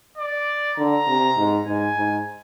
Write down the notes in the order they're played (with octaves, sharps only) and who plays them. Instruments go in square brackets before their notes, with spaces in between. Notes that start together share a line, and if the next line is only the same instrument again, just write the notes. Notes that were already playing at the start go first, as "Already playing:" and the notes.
[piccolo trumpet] D5
[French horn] D3 [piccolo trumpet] A#5
[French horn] C3
G#2
[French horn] G#2 [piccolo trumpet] G#5
[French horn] G#2